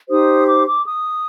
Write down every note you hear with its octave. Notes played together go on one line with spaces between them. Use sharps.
D#4 G4 C5 D#6
D6
D6
D#6